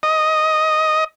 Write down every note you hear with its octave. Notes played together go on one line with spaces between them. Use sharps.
D#5